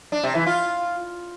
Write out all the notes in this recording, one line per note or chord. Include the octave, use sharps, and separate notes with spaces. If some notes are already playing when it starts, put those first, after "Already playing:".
D4
C3
E3
F4